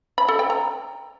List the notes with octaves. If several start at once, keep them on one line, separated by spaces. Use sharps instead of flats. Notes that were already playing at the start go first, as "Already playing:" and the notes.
B5
A4
G5
A#5